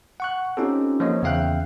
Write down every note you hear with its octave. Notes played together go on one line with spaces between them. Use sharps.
F#5 C#6 F#6
C4 C#4 D#4 F4 G4 A4
F3 A#3 C#5 D#5
E2 C#3 E5 F5 G5 F#6